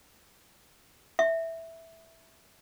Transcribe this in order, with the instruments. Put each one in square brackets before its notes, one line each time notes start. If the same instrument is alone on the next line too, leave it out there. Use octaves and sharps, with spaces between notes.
[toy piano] E5